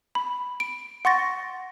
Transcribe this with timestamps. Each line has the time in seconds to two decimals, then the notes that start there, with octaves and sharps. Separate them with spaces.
0.15 B5
0.60 D7
1.05 F#5 C6 C#6 A6 A#6